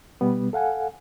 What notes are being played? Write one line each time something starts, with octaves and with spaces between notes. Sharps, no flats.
B2 G3 B3
A4 F5 F#5 G#5